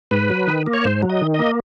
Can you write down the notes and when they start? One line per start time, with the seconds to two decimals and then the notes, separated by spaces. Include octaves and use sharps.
0.11 G#2 B4
0.30 F#3
0.47 D#3
0.66 A#3
0.73 C#5
0.84 G#2 C5
1.02 F#3
1.10 D#5
1.21 D#3
1.34 D#5
1.39 A#3